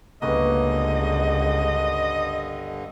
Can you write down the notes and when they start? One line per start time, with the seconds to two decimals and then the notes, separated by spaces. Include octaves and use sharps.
0.22 C#2 G2 D3 A#3 B3 C#4 D#5